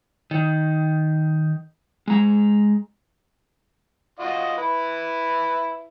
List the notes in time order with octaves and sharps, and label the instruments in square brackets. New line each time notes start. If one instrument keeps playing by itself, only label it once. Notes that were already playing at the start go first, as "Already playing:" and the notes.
[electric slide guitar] D#3
G#3 A#5
[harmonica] F4 F#4 D#5
E4 B4